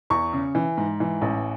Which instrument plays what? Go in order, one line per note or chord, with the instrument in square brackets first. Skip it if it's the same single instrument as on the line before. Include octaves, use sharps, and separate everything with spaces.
[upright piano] E2 C#6
C#3
E3
G#2
E3
A1